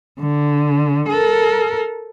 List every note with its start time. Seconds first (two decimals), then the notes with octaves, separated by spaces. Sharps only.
0.19 D3
1.08 A4 A#4